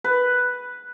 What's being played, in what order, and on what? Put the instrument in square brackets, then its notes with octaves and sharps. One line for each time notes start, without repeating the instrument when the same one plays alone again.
[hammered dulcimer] B4